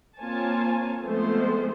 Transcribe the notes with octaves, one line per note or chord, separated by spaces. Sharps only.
A#3 C4 F4 C#5 G#5 A5
F3 G#3 A3 B3 C4 C5